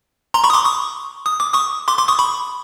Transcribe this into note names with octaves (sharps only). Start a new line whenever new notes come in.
A#5 C6
B5 C#6
D#6
C6 D6
C#6 D#6
D#6
D6
C#6 D#6
C6 D6
C6 D6
C#6 D#6
B5 C#6